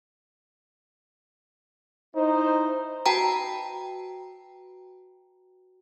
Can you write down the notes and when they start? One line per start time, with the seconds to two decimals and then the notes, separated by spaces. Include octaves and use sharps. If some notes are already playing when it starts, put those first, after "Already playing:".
2.16 D#4 E4 C5
3.06 F#4 B4 G5 A5 A#5